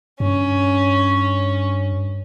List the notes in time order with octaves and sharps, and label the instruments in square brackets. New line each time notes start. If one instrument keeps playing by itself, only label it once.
[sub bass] G2 [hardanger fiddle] C#4